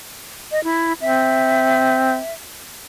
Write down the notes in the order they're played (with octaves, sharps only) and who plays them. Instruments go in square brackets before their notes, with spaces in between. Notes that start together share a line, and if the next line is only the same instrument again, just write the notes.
[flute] D#5
E4
[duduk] C4 [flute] E5